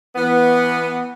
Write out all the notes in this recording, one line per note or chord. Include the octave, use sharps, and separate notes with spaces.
E3 B3